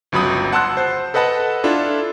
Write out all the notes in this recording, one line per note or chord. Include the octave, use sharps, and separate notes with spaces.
G1 C#2 F#3 B5 D#6
F#5 A5 C6 E6 F#6
C5
A4 B4 D#5 F#5 A5 B5
D4 E4 F4 A4